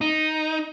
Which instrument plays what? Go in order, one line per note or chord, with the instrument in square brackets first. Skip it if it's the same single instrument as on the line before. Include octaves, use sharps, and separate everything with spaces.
[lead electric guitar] D#4